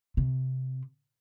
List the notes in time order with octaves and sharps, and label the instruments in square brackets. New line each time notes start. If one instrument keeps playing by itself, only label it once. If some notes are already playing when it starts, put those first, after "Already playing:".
[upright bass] C3